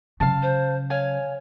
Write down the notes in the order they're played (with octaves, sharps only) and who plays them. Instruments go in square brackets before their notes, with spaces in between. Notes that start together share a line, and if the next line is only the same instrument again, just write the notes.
[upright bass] C#3 F#3 [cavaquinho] F5 A5
[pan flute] C5
[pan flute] C#5 [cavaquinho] F5 G#5